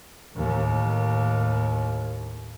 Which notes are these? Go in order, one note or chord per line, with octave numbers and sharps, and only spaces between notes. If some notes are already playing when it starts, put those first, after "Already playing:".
D#2 A2